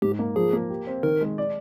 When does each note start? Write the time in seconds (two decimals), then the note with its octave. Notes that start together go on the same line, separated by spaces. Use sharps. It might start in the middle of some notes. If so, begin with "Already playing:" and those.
0.02 G#2 G4
0.19 A#3
0.36 F3 G#4
0.53 A#3
0.70 G4
0.87 C4
1.03 D#3 A#4
1.21 G#3
1.38 D5